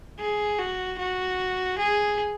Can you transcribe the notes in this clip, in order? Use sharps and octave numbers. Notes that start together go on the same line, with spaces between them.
G#4
F#4
F#4
G#4